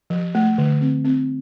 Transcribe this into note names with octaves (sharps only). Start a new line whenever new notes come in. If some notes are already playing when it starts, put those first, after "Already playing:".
F3
A3
D3
C4
C4